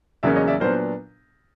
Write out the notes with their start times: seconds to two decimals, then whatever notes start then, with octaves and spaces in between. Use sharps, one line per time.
0.23 E2 C#3 F#3 A#3 C#4 D5 E5
0.36 C#5 D#5
0.48 D5 E5
0.60 A#2 F#3 B3 D4 A#4 C5